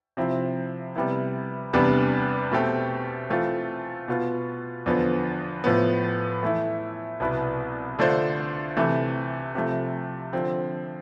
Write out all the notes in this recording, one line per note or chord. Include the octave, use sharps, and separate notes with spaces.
C3 F3 C4 E4
C3 G3 B3 E4
E2 C3 G3 B3 D4
B2 A3 C4 G4
E3 A3 C4 F4
B2 B3 F4
E2 D3 F3 B3
A2 F3 B3
E3 A3 E4
C2 B2 B3 E4 B4
D3 A3 D4 F4 C5
C3 E3 A3
C3 F3 A3
D3 F3 C4